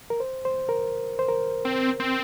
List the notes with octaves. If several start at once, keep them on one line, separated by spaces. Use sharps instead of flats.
A#4
C5
C5
A#4
C5
A#4
C4
C4